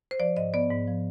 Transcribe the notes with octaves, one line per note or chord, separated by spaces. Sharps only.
C5
F3 D5
G#2 D#5
B3 D5
G#2
F3